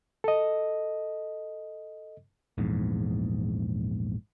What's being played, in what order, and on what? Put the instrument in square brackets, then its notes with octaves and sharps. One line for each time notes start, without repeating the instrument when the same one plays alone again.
[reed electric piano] A4 D#5
[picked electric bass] A#1 E2 G#2